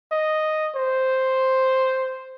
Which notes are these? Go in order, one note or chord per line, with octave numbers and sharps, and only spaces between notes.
D#5
C5